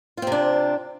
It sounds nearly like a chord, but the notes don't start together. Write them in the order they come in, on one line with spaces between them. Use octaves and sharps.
F4 C4 C3 D4